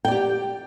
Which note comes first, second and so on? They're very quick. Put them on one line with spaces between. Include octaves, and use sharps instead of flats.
G5 D5 G4